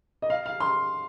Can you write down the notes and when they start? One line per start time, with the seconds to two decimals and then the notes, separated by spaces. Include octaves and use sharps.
0.22 D#5
0.30 F5
0.46 F5
0.60 C6